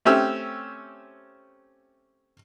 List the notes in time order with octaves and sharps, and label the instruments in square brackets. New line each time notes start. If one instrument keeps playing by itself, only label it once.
[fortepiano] A3 C4 C#4 G4 E5